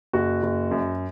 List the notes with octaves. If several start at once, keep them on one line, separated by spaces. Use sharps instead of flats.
F#1 F#4
F#1
F#2